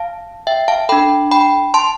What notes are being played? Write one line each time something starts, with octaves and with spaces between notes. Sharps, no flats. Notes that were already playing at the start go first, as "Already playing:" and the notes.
Already playing: F5 A5
E5 G5
F5 A5
D4 A4 G5 B5
G5 B5
A5 C6